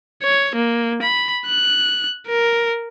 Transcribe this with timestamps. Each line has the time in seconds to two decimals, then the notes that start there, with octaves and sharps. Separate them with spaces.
0.23 C#5
0.56 A#3
1.02 B5
1.46 F#6
2.28 A#4